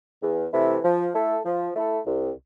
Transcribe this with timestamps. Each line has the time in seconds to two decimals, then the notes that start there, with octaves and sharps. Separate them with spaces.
0.22 E2
0.53 C3 E3 A3 E4
0.84 F3
1.14 A3 E4 A4
1.45 F3
1.76 A3 E4 A4
2.06 C2